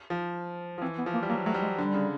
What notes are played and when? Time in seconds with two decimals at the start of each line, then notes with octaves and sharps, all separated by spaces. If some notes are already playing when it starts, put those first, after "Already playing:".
0.10 F3
0.78 F3
0.82 E3 C4
0.98 B3
1.06 F3
1.14 A#3
1.22 G3
1.30 F#3 A#3
1.46 F#3 A3
1.54 G3
1.62 G#3
1.78 D3 G3
1.94 C#3